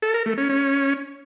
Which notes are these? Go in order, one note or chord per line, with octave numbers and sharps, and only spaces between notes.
A4
A#4
A3
C#4
C#4